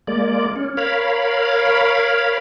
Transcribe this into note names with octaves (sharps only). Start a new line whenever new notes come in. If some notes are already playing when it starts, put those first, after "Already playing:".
G#3 A#3 D5
C#4
A#4 C#5 F5 B5